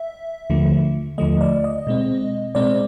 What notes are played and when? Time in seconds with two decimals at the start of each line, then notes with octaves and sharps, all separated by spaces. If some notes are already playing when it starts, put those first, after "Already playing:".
Already playing: E5
0.50 D#2 D3 F3 A3
1.18 D#2 D3 F3 A3 D#5
1.41 D5
1.64 D#5
1.87 B2 G#3 C4
2.55 B2 G#3 C4 D5